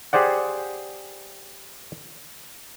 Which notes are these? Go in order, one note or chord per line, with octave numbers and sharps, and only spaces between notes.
G4 G#4 C5 D5 F#5